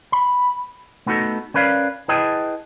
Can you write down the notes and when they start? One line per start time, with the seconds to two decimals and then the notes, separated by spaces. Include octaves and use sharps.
0.12 B5
1.06 A3 B3 D#4 F#4 A4
1.54 C#4 A#4 B4 D5 F5
2.08 E4 G#4 B4 D#5 G5 A5